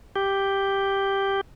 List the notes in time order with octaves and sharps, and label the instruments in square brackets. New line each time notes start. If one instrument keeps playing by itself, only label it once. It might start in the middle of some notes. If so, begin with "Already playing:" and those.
[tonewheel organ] G4